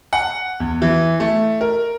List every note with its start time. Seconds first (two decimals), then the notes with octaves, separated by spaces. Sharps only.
0.13 F#5
0.60 E2
0.82 E3
1.20 A3
1.61 A#4